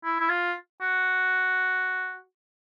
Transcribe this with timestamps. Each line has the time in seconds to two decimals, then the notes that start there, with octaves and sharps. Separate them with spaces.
0.05 E4
0.20 E4
0.29 F4
0.81 F#4